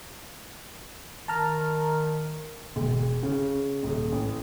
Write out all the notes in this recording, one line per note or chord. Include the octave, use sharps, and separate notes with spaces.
D#3 A5 A#5 F6
E1
C#3
D#1
A1